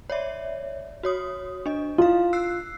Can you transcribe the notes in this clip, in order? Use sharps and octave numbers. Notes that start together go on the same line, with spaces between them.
C#5 D5 E5
F#4 C#5 D#6
D4 D#5
E4 F4 F5
E6 F#6 C7